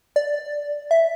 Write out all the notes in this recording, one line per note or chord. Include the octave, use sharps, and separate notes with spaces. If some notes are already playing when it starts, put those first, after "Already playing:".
D5
E5